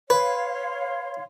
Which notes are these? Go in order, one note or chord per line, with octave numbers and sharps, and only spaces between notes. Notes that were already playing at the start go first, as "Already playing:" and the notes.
B4 C#5 F5 C6